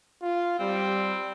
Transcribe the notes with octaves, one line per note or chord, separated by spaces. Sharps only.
F4
G3 C4